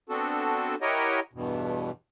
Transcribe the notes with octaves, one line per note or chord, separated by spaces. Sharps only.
B3 C4 D4 F#4 A4
E4 G4 A#4 C#5 D#5 F#5
E2 G2 B2